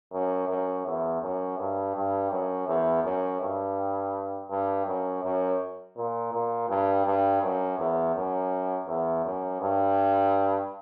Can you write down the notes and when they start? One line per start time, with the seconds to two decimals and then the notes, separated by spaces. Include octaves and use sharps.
0.12 F#2
0.49 F#2
0.86 E2
1.21 F#2
1.58 G2
1.95 G2
2.31 F#2
2.68 E2
3.04 F#2
3.41 G2
4.50 G2
4.86 F#2
5.24 F#2
5.97 A#2
6.33 A#2
6.69 G2
7.06 G2
7.42 F#2
7.79 E2
8.15 F#2
8.88 E2
9.25 F#2
9.62 G2